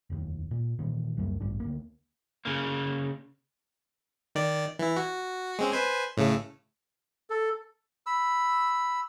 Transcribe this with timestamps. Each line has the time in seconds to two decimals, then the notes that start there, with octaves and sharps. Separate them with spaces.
0.10 F1 D#2
0.51 A#2
0.79 A#2 D#3 E3
1.17 C#2 F#2 G3 A#3
1.40 A1 G2 D4
1.60 D2 A#3
2.45 C#3 A#3
4.35 D#3 D5
4.79 E3 E4
4.96 F#4
5.59 G#3 C4 C#4
5.72 B4 C5 G#5
6.17 A2 C#3 A3
7.30 A4
8.06 B5 E6